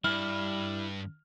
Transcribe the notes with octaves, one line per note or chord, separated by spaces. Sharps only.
G2 G3 E4 F6